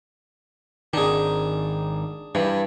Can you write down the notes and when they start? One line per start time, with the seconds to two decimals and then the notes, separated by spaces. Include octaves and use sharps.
0.93 G#1 D#3 D4 G#4
2.35 G2 E3